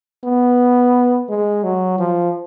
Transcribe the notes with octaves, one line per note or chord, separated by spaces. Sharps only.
B3
G#3
F#3
F3